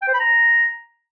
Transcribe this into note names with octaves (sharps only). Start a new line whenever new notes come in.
G5
C5
B5
A#5